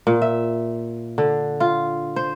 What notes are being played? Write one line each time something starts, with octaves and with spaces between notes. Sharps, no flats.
A#2
E5
D3
F4
C5